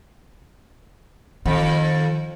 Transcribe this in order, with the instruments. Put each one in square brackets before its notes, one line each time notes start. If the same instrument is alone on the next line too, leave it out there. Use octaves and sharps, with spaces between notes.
[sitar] F2 [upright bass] D#3